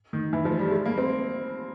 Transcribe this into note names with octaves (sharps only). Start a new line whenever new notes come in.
D#3
E3
F3
G3
G#3
A#3
C4